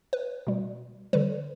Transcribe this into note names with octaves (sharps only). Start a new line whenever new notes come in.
B4
B2 G3
D3 G3 B4